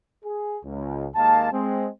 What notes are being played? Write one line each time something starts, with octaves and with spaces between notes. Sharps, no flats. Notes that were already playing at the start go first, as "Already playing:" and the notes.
G#4
C#2
D#2 G#3 A#3 F5 A5
G#3 C4